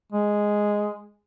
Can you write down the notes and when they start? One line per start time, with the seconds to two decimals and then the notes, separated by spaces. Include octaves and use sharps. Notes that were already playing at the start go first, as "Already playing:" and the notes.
0.12 G#3